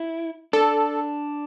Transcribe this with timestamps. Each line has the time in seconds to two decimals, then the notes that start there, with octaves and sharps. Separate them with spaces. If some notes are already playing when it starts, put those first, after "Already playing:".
Already playing: E4
0.53 D4 A4